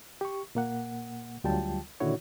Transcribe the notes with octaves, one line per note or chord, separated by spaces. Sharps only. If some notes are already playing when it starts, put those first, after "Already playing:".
G4 C#6
A#2 A#3 F#5
D2 F#3 G3 F4 G5 A5
A#2 D3 D#3 E4 F#4 C#5